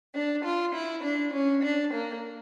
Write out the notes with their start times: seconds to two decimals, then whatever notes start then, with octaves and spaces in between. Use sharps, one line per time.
0.14 D4
0.44 F4
0.74 E4
1.03 D4
1.33 C#4
1.63 D4
1.93 A#3